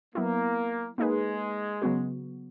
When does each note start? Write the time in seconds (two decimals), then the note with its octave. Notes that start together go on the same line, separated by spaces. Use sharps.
0.15 F#3 A#3 B3 E4
0.98 G#3 A#3 D#4 G#4 B4
1.82 C#3 F#3 B3 F#4